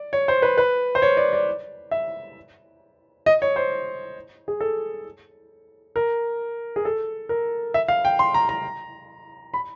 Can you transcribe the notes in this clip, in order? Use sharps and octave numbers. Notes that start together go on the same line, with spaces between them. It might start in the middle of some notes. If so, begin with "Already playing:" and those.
Already playing: D5
C#5
C5
B4
B4
C5
C#5
D5
D5
E5
D#5
C#5
C5
G#4
A4
A#4
G#4
A4
A#4
E5
F5
G5
C6
A#5
A#5
B5